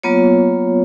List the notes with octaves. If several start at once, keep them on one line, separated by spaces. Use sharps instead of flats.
F#3 A#3 B3 F4 C#5